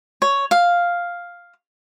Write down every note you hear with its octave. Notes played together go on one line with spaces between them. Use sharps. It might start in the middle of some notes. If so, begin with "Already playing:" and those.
C#5
F5